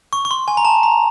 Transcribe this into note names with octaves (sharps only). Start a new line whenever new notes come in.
C#6
C#6
C6
G#5
A#5
A5
A#5